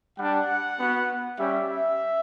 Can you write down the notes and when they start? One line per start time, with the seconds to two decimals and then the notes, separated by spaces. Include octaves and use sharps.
0.19 G3 D4 G4 F#5
0.79 B3 F#4
1.38 G3 C#4 G4 E5
1.68 E5